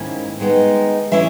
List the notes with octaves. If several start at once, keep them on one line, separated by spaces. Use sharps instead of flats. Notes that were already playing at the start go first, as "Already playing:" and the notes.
Already playing: G#2 D#3 A#3 C#4 E4
D#3 G#3 B3 D#4
E3 G#3 C#4 E4 E5